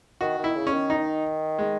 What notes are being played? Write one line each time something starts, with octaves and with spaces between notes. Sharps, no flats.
D#3 F#4
D#3
E4
C#3
C#4
D#3
D#4
G#3